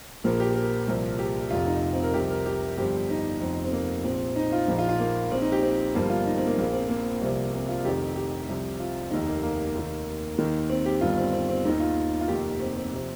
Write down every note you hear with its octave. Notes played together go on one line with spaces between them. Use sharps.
A#1 A#2 F3 A#4
G4
A#4
C2 A#2 F3
G4
F1 F2 C3 F4
D#4
C4
A#4
C2 C3 F3 G4
A#4
G4
A#4
G1 G2 F3 G4
D#4
F1 F2 F3
C4
A#3
A#1 A#2 F3 C4
D#4
F4
A#1 A#2 F3 D#4
F4
F4
A#3
A#1 A#2 F3 C4
D#4
G4
C4
G1 G2 F3 A#3
F4
D#4
C4
A#3
A#1 A#2 F3 A#3
C4
A#3
C2 C3 F3
C4
F4
F1 F2 D#3 G4
G4
C2 C3 F3
F4
F1 D#2 D#3 D#4
A#3
A#3
D#2 D#3
D#2 D#3
C4
G4
G1 G2 D#3 F4
C4
C4
C4
D#2 D#3 D#4
F4
F4
F1 D#2 D#3 G4
C4
C4
C3 F3